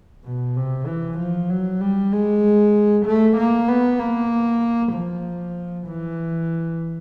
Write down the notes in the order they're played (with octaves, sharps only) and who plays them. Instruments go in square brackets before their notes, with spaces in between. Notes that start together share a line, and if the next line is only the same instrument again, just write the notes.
[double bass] B2
C3
E3
F3
F#3
G3
G#3
A3
A#3
B3
A#3
F3
E3